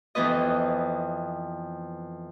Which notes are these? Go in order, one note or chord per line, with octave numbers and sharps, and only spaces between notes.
F2 E3 B3 B4 D#5